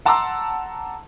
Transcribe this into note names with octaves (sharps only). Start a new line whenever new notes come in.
F#5 A5 A#5 C6 D6 E6